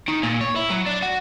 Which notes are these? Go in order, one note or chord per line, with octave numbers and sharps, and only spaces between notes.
D#3
A#2
C#5
E4
F#3
D4
F#4